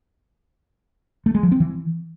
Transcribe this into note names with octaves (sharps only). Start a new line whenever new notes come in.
A3
G#3
F3
C4
E3